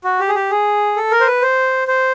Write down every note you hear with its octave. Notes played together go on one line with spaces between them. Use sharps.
F#4
G4
G#4
G4
G#4
A4
A#4
C5
B4
C5
C5